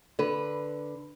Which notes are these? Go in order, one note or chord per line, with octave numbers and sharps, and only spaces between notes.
D3 B4